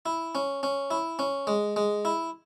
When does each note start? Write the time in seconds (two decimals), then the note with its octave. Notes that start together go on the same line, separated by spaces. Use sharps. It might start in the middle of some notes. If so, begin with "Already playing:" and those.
0.06 E4
0.35 C#4
0.63 C#4
0.91 E4
1.19 C#4
1.47 G#3
1.76 G#3
2.05 E4